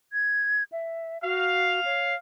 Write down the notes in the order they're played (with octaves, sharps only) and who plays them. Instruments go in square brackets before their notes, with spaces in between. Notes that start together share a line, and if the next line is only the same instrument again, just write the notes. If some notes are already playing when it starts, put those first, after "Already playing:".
[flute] G#6
E5
[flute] F#4 [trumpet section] F5
[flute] C#5